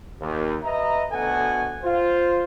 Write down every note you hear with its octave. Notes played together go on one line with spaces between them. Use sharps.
D#2
B4 D#5 E5 A#5
D2 B2 A4 F#5 G#5
F4 C5